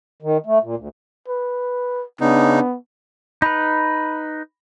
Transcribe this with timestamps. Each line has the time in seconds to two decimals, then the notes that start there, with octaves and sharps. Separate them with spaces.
0.22 D#3
0.46 A3
0.63 A#2
0.76 D2
1.28 B4
2.21 C#3 B3 D4 D#4
3.42 D#4 B4 B5